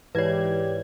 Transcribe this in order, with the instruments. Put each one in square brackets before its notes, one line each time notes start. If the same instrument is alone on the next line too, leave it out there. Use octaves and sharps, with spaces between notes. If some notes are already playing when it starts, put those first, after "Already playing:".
[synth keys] G#2 E3 G#6 [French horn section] G4 D5 [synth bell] B4 C#5